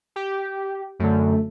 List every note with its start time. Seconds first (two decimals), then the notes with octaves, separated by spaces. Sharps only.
0.16 G4
0.99 F#2 D3 A3